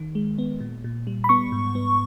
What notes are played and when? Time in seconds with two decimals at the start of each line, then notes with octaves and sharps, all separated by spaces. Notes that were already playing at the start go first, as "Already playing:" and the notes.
Already playing: D#3
0.15 G#3
0.38 B3
0.60 A#2
0.84 A#2
1.07 G3
1.24 B5
1.29 B3 C#6
1.52 G#2
1.75 B3